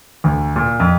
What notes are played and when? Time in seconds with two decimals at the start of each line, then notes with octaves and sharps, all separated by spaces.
0.24 D2
0.56 A#2
0.80 F2